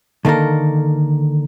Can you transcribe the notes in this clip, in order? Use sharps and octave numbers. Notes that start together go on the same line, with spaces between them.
D3 D#3 A#3 A4 A#4